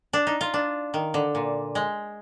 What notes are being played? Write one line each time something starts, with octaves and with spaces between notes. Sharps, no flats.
D4
D#4
F4
D4
D#3
D3
A#2
G#3